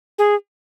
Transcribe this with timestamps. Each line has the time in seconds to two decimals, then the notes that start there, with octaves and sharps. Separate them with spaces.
0.19 G#4